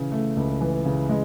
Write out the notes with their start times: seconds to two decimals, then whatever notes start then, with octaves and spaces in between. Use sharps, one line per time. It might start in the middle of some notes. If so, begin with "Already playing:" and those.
Already playing: C#3 E3
0.12 A3
0.37 C#2
0.61 E3
0.85 C#3
1.09 G#3